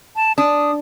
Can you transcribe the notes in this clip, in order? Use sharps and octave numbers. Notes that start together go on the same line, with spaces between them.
A5
D4 D#6